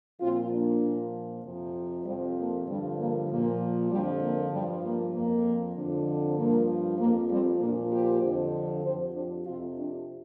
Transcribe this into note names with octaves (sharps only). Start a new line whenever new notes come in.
A#2 F3 C4 F4
A#3 D4
A#2 F3
F2 C3 F3
F2 C3 F3 G3 C4
A#3
G2 D3 F3 G3
A#3
A#2 F3 A#3
F2 D3 F3 G3
A#3
G2 F3 G3
A#3
F2 F3 A#3
F2 D3 F3
G2 F3 A#3
F2 F3 A#3
G3 C4
A#2 F3 A#3 D4
G4 C5
F2 D3 F3
F2 F3 G4 C5
D4 G4
F2 C3 F3 C4 F4
D4 G4